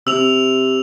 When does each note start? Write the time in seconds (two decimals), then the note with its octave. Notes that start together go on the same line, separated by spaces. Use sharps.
0.07 C3 E6 F7